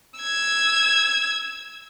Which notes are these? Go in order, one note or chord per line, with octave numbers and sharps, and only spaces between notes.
E6 G#6